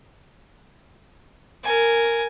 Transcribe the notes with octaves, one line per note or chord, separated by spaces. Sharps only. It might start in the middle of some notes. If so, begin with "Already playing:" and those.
A#4 G#5